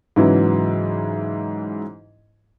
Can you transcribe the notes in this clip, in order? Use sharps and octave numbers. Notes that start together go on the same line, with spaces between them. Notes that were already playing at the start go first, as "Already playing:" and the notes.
G#2 C#3 E3 F#3 E4